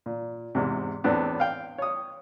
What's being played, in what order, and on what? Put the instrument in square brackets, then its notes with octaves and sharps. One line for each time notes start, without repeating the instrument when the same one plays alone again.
[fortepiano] A#2
E2 G#2 C3
E2 A2 B3 C4 D4
F5 G5
C#5 D#6